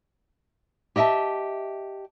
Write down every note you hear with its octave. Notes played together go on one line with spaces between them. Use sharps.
G4 D#5 E5 G5 A5